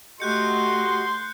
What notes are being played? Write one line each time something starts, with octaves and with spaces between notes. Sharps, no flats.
A3 F#4 G4 D#5 C6 F#6 G6 C#7